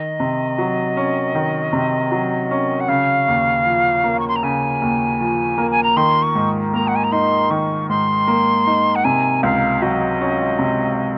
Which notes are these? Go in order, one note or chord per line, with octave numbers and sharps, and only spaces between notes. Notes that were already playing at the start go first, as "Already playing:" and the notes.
Already playing: D#3 D#5
C3
F#3
C#4
D#3
C3
F#3
C#4
F#5
C#3 F5
D#2
F3
A#3
C#6
C6
A#5
C#3 G#5
D#2
F3
A#3
G#5
A#5
D#3 C6
C#6
G#2
A#3 A#5
F#5
G#5
A#5
D#4 C6
D#3 C#6
G#2 C6
A#3
D#4
F#5
C3 G#5
C#2 F5
F#3 D#5
C#4
C3